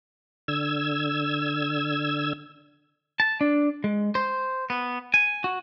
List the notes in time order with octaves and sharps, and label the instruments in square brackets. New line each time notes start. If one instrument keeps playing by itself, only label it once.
[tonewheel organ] D3 E6 G#6
[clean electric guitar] A5
D4
G#3
C5
B3
G#5
F#4